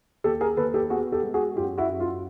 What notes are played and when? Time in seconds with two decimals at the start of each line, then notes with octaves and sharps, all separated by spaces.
0.24 D#2 G4 A4
0.41 G#4 A#4
0.57 D#2 A4 B4
0.74 G4 A4
0.90 B3 F#4 G#4
1.12 G4 A4
1.23 G#3
1.34 F#4 G#4
1.56 F#2 F4 G4
1.78 E4 F#4
1.89 F#2
2.00 F4